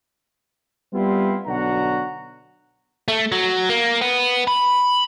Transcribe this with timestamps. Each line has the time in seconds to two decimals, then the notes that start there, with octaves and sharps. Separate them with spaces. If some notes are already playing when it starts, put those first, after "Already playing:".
0.93 G3 B3 C4 E4 F4
1.46 B1 D3 F#4 F#5 A#5
3.08 A3
3.32 F#3
3.69 A#3
4.01 B3
4.47 B5